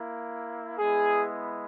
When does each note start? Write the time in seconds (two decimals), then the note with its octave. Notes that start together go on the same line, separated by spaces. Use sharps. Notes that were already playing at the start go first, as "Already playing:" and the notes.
Already playing: A#3 E4
0.79 G#3 B3 E4 G#4